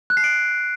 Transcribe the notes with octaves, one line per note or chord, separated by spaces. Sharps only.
F#6
C7
D7